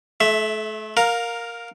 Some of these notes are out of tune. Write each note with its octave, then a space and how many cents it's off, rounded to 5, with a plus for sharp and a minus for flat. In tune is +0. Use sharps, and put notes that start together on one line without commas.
A3 -35 E5 +0
A#4 +0 F5 +20 A#5 -5